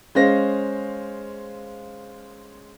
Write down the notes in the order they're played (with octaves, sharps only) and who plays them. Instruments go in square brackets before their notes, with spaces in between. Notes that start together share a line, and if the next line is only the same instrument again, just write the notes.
[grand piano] G#3 C#4 C5 F5 A#6